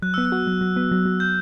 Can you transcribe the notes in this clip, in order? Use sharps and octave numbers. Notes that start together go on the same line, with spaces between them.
F#3 F#6
B3 E6
F#6
F#4
F#3
F#3
B3
F#3
F#3
G6